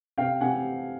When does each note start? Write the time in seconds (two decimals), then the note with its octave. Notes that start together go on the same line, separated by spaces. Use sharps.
0.18 C3 F5 G5
0.41 C3 F#5 G#5